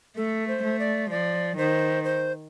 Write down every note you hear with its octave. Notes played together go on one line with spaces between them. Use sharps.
A3 A4
C5
A3
D5
F3 D5
D#3 C5
C5